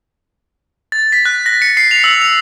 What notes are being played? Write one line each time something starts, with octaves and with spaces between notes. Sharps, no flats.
A6
B6
F#6
A#6
C#7
C7
F7
E6
F7